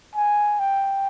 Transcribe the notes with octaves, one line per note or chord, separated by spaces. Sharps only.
G#5
G5